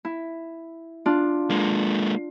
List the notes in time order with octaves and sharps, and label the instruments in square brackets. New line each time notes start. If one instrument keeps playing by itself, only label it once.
[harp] E4
D4 F4
[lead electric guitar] G#3 A#3